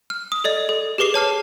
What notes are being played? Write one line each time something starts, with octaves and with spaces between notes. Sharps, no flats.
F6
D#6
A4 D5 D#5
A4
G4 G#4 B4 D6 C7
C#5 A5 F6 C7